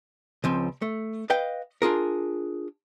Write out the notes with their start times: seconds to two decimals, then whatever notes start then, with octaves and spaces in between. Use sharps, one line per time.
0.44 C#2 F3 C4
0.82 A3
1.30 B4 D#5 F5 G5
1.82 D4 F4 G#4 A#4